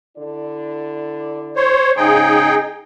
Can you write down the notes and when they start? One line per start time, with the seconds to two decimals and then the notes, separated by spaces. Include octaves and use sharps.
0.17 D3 E4 D5
1.56 C5 C#5
1.97 G#2 C#3 D#4 G#4 G5